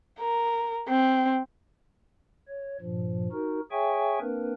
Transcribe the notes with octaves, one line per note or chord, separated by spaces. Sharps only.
A#4
C4
C#5
G2 A#2 F3
D#4 F#4 A#4
G#4 C#5 E5 G5 G#5 C#6
A#3 C4 D4 A#4 B4